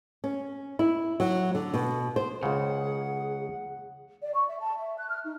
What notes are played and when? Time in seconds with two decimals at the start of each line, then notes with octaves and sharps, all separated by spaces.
0.24 C#4
0.79 E4
1.20 F#3
1.55 D3
1.74 B2
2.16 C5
2.43 C#2 C#3 G#4 F#5
4.22 D5
4.34 C#6
4.48 E5
4.59 A5
4.78 E5
4.97 F#6
5.09 F6
5.23 D#4